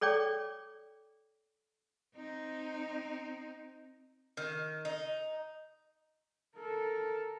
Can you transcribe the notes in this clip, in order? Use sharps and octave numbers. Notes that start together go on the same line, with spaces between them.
A4 C#5 D5 G5 D6
C4 D#4
D#3
D#4
A4 A#4